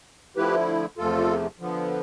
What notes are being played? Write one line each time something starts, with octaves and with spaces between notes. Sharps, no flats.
D3 F3 A3 E4 G4 B4
E2 C3 F3 A3 F4 A4
D3 F3 B3